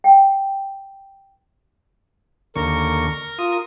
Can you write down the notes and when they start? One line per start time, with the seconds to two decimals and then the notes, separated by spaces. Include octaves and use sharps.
0.04 G5
2.56 D#2 D3 A#4 C#6
3.39 F4 D#6